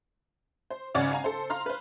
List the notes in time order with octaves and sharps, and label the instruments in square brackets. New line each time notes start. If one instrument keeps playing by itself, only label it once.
[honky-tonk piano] C5
G#1 C#3 C#4 D5 F#5
F5 G#5 A#5
A4 C5
F5 A#5 C6 F6
B4 C5